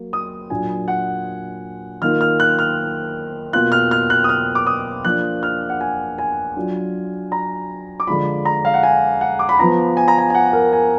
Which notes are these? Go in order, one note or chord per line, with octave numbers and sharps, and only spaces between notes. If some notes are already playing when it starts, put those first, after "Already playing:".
Already playing: F#3 A#3
D#6
A#2 F#3 D4 F4 G#5
F#5
D#3 A#3 F4 F6
F6
F#6
F6
B2 A#3 F4 F#6
F6
F6
F#6
D#6
F6
D6
D#6
F3 A#3 D4 F4 F#6
F6
F#5
G#5
G#5
F#3 D4 F4
A#5
D6
D3 F3 G#3 D4 F4 B5
A#5
F5
F#5
G#5
F#5
D6
B5
F3 B3 F4 A#5
G#5
A#5
G#5
G#5
F#5
A#4
G#5